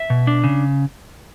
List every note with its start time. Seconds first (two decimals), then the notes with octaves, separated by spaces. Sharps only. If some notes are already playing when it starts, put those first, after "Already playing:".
Already playing: E5
0.10 B2
0.27 D4
0.44 C#3